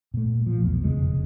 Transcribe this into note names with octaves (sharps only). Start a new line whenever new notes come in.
A#2 A3
F3
B1 E2
F1 C#3 G#3